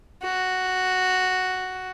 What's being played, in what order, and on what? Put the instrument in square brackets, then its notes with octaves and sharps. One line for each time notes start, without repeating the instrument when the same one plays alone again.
[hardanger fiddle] F#4